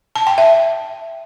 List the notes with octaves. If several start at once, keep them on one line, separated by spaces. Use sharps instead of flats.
A5
G5
E5